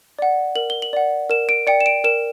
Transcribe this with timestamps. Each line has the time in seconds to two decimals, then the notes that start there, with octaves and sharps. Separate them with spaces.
0.19 D5 F#5
0.55 A#4 F#7
0.70 G7
0.82 F#7
0.93 D5 F#5
1.29 A#4 E7
1.49 D7
1.67 D5 G5 C#7
1.81 E7
1.86 D7
2.04 A#4 E7